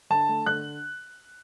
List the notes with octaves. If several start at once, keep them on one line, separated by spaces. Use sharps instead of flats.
D3 A5
A3
D3 F#6